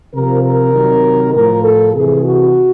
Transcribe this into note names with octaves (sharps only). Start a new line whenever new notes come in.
C3 F3 A#4
A#4
C3 D#3 F#3
A2 F3 A#4
A4
C3 E3 G#4
F#4